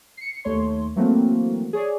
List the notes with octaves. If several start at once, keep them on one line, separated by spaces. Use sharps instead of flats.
C7 C#7
D#2 A3 C#5 C6
E3 F#3 A3 A#3 C4 F#4
G#4 C#5 D5